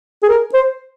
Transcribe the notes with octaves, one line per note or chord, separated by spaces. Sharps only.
G#4
A#4
C5